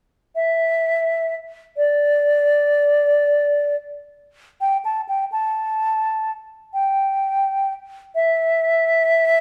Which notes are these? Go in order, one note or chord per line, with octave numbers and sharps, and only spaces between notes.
E5
D5
G5
A5
G5
A5
G5
E5